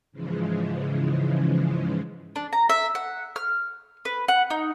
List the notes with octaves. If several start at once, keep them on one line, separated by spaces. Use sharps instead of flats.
G#2 C#3 E3 F3 G#3
D4
A#5
E5
F#5
F6
B4
F#5
D#4